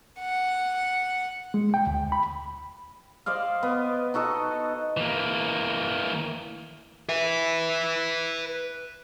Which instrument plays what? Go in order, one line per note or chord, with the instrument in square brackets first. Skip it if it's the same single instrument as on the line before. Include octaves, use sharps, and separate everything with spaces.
[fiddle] F#5
[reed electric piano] G#3
G5
D2
B5
[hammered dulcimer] C5 D5 D#5 F5
B3
D#4 F#4 A4 D#5
[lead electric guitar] E3 A#3
B4 E5